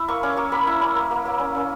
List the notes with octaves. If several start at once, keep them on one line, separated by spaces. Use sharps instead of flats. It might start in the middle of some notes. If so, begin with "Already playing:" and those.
Already playing: E4
A#3 C#6
C#4 D6
A#3 C#6
A#3 B5
E4
C#4
A#3
A#3
A#3
C#4
C#4